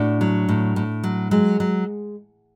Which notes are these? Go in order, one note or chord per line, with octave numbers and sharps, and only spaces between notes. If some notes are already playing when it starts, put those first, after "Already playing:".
Already playing: A2 D4 F#4
F#3
A2
A2
F#3
F#3 G#3
F#3